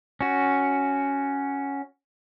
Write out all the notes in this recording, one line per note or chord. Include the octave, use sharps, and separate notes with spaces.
C#4 F#4